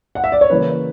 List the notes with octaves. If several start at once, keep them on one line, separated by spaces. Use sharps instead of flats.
F#5
E5
D5
C#5
C#3 E3 A#3 B4